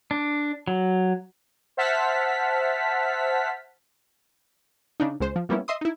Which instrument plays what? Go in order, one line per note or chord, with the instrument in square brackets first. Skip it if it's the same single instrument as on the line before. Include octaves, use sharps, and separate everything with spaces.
[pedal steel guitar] D4
F#3
[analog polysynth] C5 E5 F#5 A5 F6 B6
[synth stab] C#3 D4 D#4
C#2 G#3 C5
F3
F3 G3 A#3 B3 C#4 E4
D#5 E5 C6 D#6
D#4 E4